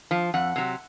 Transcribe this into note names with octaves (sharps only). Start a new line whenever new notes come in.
F3
F2 F#5
C3 F#3